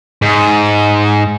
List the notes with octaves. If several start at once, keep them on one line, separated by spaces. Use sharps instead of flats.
G#2